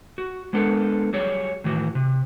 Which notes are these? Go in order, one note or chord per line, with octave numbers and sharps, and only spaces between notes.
F#4
G#3 B3 D4 A4 A#4
F#3 G3 G#4 C#5
A2 D#3 E3 F#4
C3